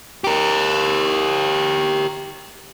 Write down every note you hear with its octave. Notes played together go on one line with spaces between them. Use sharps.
G4 A#4